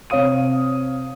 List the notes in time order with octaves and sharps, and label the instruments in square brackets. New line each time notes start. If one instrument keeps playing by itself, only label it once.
[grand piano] C3 C#5 F5 D#6 D#7